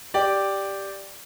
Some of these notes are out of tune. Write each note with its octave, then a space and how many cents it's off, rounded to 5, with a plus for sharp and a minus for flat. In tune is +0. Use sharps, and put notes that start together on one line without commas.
G4 +0 D5 +0